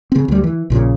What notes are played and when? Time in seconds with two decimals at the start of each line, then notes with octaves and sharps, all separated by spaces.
0.12 C#3 C4
0.28 D2 G3
0.44 E3
0.70 A#1 A#2 C#3